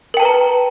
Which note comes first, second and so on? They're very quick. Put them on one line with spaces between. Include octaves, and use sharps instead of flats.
A#4 G5 A5 B4 A#5